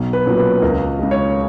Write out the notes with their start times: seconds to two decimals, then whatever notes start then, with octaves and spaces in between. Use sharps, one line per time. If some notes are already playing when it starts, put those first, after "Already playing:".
Already playing: B1
0.13 B4
0.26 A#2 F#3 C#4
0.38 B4
0.62 C#2 A#4
0.99 C#3 G#3
1.11 C#5